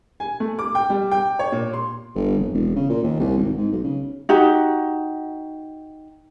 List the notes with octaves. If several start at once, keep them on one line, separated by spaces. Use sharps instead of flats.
G#5
A3
D6
G5
G3
G5
C#5
A#2
C6
G1
F1
E1
C#3
A#2
D#2
C2
G#1
G#2
B1
C#3
D#4 F#4 G4